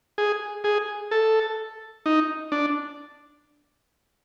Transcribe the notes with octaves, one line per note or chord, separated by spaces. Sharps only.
G#4
G#4
A4
D#4
D4